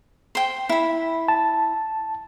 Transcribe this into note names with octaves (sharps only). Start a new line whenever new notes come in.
C5 G5
E4 B5
A5